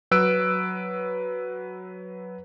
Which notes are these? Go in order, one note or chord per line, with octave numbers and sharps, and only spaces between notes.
F#3 B4 E6 F#6 D7